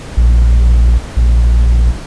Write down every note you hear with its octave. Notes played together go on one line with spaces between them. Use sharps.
A#1
A#1